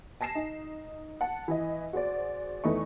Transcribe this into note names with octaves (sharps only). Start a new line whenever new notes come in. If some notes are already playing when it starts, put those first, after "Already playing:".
G#5 A5 A#6 C7 E7
D#4
F#5 A5
E3 D#5
F#4 G#4 C5 D5
E2 E3 A3 D#4 B4 C#6